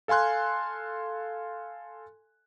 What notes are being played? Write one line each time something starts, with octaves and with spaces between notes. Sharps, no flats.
A4 F5 G#5 C6 F#6